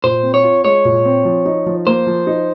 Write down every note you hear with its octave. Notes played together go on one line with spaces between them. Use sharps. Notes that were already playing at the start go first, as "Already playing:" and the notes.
A#2 C5
C4
C#5
F4
G#3 C#5
A#2
C4
F3
D#4
F3
A#3 C5
F3
D#4